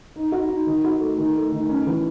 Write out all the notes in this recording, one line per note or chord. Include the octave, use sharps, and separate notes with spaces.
D#4
F#4
D#4
D#3
F#4
A3
D#3
A3
D#3
C#4
E3